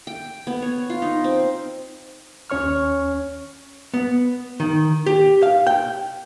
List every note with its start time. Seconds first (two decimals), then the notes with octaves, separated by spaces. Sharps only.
0.07 G5
0.47 B3
0.62 C#5
0.90 F4
1.02 D#4
1.24 C4
2.50 D#2 C#4 C#5 C#6 F6
3.94 B3
4.60 D#3
5.06 G4
5.43 F5
5.67 G5